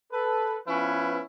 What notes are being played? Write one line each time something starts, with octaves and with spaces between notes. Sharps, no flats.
A4 B4
F3 B3 C#4 E4 B4